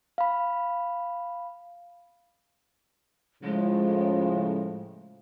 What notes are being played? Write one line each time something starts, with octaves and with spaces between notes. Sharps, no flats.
F5 B5
A2 C#3 F3 G#3